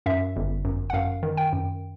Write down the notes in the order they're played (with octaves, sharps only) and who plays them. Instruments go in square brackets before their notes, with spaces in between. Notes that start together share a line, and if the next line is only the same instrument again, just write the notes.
[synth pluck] F#2 E5
G1
F#2
F#5
F#2 F5
D#3
G5
F#2